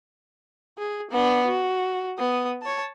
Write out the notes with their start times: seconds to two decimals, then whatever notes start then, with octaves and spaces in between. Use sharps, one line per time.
0.78 G#4
1.11 B3 D4
1.47 F#4
2.18 B3 D#6
2.62 C#5 A5